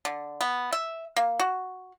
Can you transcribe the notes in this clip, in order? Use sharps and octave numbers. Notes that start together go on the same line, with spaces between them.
D3
B3
E5
A#3
F#4